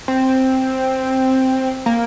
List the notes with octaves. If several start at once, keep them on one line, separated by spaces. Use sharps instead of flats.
C4
A#3